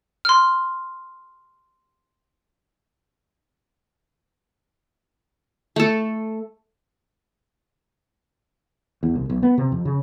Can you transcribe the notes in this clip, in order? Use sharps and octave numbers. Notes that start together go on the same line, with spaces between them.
C6 F6
A3 A4
E2
C2
B1
B3
C3
F2
C#3